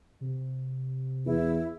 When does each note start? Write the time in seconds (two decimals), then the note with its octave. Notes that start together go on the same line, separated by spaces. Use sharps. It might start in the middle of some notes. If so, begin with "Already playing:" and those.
0.21 C3
1.25 E2 E4